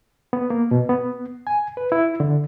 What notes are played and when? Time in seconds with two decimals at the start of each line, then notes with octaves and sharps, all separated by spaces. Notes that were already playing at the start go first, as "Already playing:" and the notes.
0.33 B3
0.50 A#3
0.71 B2
0.89 B3
1.47 G#5
1.77 B4
1.92 E4
2.20 D3